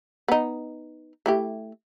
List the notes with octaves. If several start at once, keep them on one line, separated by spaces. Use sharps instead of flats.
B3 D#4
A3 E4 G4